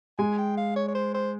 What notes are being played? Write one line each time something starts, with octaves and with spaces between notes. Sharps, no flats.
G#3 G#5
G5
F5
C#5
C#5
C5
C5